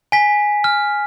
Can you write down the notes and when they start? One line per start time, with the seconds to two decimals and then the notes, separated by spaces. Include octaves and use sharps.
0.12 G#5 B6
0.64 F6